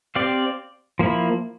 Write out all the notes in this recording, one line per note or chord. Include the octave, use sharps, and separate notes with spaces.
C4 G4 D5 F5
F3 A#3 E4